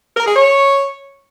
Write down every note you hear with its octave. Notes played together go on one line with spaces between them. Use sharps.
A#4
G#4
C#5